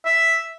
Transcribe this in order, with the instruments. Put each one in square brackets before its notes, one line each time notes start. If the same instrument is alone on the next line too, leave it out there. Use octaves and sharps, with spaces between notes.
[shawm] E5